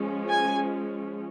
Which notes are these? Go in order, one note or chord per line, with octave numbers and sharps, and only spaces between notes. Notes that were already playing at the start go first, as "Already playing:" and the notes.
Already playing: F3 G#3 C#4
G#5